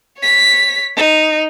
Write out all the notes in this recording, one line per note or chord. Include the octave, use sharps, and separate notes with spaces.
C#5 B6
D#4